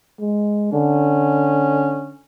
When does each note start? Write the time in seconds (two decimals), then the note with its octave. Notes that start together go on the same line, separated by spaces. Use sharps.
0.20 G#3
0.73 D3 C#4